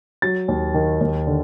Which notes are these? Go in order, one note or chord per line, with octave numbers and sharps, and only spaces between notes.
F#3 A6
D#2
D#3
D#2
D3